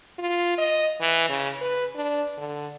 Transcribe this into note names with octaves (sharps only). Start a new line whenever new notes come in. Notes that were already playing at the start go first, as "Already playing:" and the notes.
F4
D#5
E3
C#3
B4
D4
D3